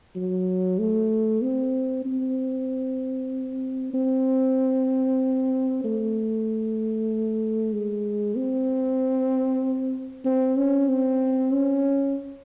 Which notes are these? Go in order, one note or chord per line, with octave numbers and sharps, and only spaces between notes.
F#3
A3
C4
C4
C4
A3
G#3
C4
C4
C#4
C4
C#4